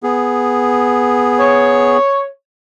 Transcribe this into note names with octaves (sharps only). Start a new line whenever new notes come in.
B3 G#4
C#5